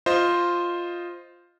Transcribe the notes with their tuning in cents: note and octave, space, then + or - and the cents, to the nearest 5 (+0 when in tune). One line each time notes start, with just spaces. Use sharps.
F4 +0 C5 +0 D#5 +0